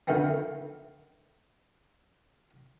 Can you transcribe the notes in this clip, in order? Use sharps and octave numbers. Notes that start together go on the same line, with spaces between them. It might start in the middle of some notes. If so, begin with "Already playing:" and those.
F2 D3 D#3 A3 B3 C4